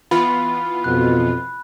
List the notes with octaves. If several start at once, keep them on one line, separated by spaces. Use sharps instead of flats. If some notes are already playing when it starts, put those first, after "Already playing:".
E3 B3 F4 B5
F2 B2 F#6